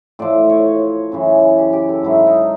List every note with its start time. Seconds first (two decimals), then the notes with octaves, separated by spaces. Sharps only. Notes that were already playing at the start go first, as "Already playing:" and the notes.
0.19 A2 F3 D5
0.50 C#5
1.12 F#2 C#3 E3
1.58 G4
1.73 G4
1.89 A4
2.03 G#2 D#3 F#3 E4
2.27 D#4